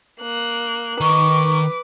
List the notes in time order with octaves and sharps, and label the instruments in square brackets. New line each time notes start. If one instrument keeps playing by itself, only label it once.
[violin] A#3 F#6
[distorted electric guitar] D#3 D#5 [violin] B4 D6 [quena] C#6